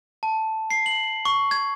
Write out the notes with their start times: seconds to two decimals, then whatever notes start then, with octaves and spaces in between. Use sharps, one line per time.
0.23 A5
0.71 C7
0.86 F#7
1.25 C#6
1.51 G#6